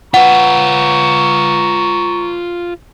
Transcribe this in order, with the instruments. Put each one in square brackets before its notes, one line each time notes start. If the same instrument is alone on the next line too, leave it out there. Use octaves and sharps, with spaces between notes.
[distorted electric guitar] F4 B4 [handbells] F#5 [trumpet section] A#5 C#6